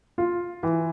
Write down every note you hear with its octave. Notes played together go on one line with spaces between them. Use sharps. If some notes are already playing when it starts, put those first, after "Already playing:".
F4
E3